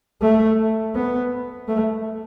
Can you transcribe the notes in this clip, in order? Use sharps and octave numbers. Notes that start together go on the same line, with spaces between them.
A3
B3
A3